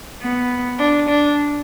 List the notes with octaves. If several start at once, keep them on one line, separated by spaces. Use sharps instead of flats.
B3
D4
D4